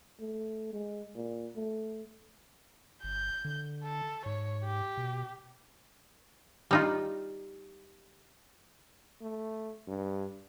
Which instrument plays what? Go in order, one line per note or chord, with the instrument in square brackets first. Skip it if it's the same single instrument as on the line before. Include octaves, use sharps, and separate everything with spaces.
[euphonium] A3
G#3
A#2
A3
[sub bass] G1 [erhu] G6
[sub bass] D3
[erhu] A4
[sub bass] G#2 [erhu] C#5
[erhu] G4
[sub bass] B2
[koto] G3 D#4 F4
[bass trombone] A3
G2